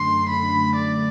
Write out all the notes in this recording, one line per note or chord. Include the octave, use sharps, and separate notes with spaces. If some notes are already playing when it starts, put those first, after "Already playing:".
Already playing: F#2 D3 A3 D4 C6
B5
D5